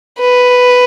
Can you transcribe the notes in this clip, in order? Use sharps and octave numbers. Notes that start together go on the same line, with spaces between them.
B4